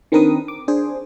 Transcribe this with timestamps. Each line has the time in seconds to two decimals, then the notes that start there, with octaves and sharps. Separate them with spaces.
0.12 D#3 C4 D4 A#4 B4 D#6
0.48 D6
0.68 D4 G#4 C5